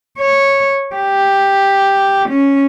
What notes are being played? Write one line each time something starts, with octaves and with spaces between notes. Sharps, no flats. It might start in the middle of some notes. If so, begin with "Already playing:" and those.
C#5
G4
C#4